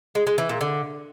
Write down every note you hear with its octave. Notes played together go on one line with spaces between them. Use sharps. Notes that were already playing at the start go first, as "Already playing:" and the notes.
G#3
G#3
E3
A#2
D3